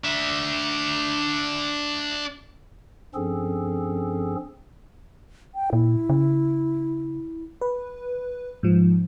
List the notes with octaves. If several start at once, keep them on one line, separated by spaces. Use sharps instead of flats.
D4 E5
G2 F3 C4 C#4 G#4 A4
G5
A#2 E4
C#3
B4
G#2 F3